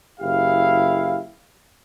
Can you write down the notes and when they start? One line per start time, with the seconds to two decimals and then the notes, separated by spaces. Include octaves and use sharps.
0.20 F#1 E4 G4 F5